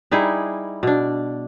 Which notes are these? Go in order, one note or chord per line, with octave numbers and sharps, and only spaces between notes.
G3 D#4 E4 G#4
B2 D4